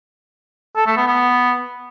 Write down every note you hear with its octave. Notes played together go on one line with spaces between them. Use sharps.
A4
A3
B3
B3